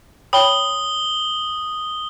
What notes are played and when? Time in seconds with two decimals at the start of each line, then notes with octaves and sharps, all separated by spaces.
0.33 C#5 G5 B5 D#6 G7